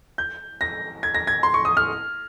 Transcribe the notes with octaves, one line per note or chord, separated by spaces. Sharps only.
G6
A#6
G#6
A#6
G#6
C6
C#6
D#6
F6